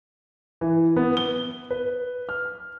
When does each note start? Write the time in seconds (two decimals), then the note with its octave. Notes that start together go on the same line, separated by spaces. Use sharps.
0.61 E3
0.96 B3
1.17 G7
1.71 B4
2.29 F6